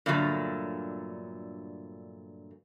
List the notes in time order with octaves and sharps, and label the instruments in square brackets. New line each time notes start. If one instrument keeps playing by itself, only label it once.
[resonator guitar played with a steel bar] G2 A#2 D3 F#3 A3